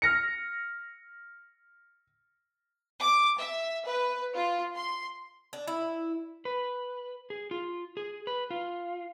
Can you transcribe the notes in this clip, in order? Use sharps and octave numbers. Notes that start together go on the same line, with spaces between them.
F6 A#6 C#7
D6
E5
B4
F4
C6
D4
E4
B4
G#4
F4
G#4
B4
F4